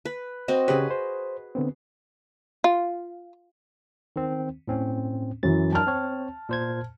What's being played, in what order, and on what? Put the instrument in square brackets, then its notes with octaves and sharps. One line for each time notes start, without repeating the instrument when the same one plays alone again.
[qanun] B4
C4 F#4 D#5
[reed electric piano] C#3 G4 C#5 [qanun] G#4 B4
[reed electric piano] C5
D3 B3 C4
[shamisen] F4
[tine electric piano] D#3 C4
A2 C4 C#4
[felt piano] F#2 E3 [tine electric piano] A6
[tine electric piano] F#3 D4 A#4 [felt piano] A5 F6
[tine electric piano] C4 C#5
A#2 C5 G#6